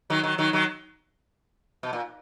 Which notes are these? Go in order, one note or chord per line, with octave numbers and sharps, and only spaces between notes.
D#3 F#3
D#3 F#3
D#3 F#3
D#3 F#3
B2
A#2